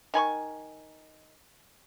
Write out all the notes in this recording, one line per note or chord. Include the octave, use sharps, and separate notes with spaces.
D#3 G#5 B5 C#6